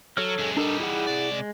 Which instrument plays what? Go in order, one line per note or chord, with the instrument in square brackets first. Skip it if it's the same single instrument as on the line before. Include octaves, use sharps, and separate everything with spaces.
[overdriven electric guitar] F#3 [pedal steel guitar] A4 C#5 F6
[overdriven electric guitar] F#2 G#3
[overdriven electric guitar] G3 D#4 [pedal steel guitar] D4 A4 A#4
[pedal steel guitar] E4 G#4 F#5
[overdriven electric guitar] C3 D5
[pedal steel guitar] G#3